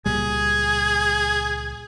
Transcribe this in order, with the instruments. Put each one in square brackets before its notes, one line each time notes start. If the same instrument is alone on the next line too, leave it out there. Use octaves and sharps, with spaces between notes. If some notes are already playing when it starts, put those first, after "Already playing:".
[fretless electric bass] C#2 A#2 G3 [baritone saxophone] G#4